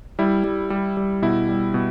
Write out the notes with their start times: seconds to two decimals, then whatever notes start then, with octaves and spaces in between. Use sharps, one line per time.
0.19 G3 E4
0.44 G3
0.70 G3
0.97 G3
1.22 B2 E4
1.49 G3
1.74 B2